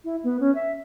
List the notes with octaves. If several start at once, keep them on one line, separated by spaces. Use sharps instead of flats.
E4
B3
C#4
E5